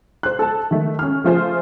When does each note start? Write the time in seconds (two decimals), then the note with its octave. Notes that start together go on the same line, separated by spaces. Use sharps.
0.23 C5 F#6
0.39 A4 A5
0.71 D#3 A3
0.99 C#4 F6
1.24 F3 A3 F4 G#4 C5